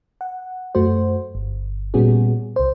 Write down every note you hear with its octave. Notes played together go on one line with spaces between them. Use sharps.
F#5
F#2 A3 F#4 C5
G1
A#2 G3 B3 C#4 F#4 G#4
C2 C5